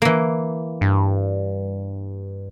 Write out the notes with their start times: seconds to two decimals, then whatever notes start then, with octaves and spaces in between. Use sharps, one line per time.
0.02 E3 A#3
0.81 G2